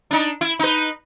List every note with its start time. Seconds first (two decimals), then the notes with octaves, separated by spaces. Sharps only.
0.11 D4 D#4
0.41 E4
0.59 D#4 B4